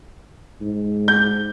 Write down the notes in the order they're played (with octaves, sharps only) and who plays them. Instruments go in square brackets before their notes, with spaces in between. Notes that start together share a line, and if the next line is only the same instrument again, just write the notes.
[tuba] G#2
[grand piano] G6